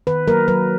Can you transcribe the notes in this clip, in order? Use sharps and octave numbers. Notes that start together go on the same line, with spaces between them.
D#3 B4
F#3 A#3 A#4
F#3 B4